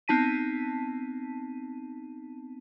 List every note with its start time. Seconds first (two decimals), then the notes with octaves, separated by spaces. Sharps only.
0.08 B3 C4 D#4 A5 B6 D#7